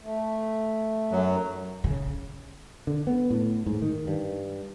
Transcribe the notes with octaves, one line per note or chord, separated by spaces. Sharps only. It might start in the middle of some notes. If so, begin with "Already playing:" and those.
A3
F#2 F#3
C#3
D3
B3
A2
G#2
D#3
G2